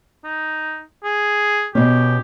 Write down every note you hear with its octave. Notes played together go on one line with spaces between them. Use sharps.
D#4
G#4
B2 C#4 G4